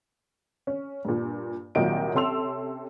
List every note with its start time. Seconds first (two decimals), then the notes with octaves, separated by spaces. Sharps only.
0.67 C#4
1.05 G2 A#2
1.75 C2 A#2 D#3 F#3 D#5 D7
2.14 C3 C#4 A4 C6 E6 F7